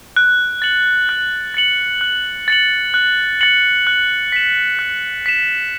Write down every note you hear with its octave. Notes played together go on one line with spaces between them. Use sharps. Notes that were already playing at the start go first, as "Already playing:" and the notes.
F#6
A6 C#7 F#7
F#6
A6 C#7 F#7
F#6
A6 C#7 F#7
F#6
A6 C#7 F#7
F#6
B6 E7
F#6
B6 E7